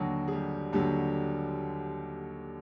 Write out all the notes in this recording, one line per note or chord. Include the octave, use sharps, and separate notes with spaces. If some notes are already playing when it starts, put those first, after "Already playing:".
Already playing: D#2 D3 F#3 F#4
G#4
G3 G4
D#2 D3 F#3 G3 G4